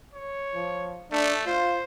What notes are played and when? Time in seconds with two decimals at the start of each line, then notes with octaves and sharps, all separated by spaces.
0.14 C#5
0.54 F3
1.12 A3 D4
1.46 F4 C5